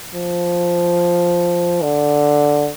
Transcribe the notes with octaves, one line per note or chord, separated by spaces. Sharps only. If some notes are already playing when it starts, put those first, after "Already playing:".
F3
D3